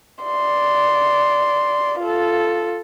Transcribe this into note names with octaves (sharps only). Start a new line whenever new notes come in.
D5 C6
F4 A4